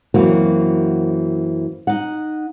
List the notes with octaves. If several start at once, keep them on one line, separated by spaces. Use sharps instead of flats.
F#2 E3 A#3 C4 F#4
D#4 F#5